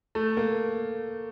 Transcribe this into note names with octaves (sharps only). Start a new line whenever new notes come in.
A3
A#3